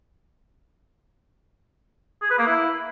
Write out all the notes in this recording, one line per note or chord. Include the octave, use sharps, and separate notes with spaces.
G#4
B4
A#3
E4